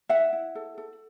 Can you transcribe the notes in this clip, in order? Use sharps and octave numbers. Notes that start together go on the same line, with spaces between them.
E4 E5 F#5
E4
A4
A4